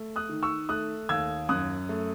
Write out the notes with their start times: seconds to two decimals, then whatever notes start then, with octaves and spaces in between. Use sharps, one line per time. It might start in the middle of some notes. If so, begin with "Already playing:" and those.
Already playing: A3
0.16 D#6 F#6
0.29 D#3
0.43 C#6 E6
0.69 A3 D#6 F#6
1.09 D#2 E6 G#6
1.49 F#2 D#6 F#6
1.89 A3